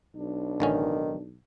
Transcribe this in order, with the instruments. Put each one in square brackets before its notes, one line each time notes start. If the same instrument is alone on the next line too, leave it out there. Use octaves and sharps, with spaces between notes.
[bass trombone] B1 [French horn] D4
[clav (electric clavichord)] A1 D3 C#4 [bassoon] D#3